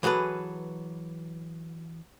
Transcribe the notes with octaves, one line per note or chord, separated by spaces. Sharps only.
E3 F#3 G#4 A4 B4